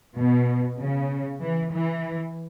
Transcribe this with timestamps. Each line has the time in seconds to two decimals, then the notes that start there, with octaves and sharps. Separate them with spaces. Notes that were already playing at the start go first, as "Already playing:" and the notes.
0.17 B2
0.79 C#3
1.41 E3
1.72 E3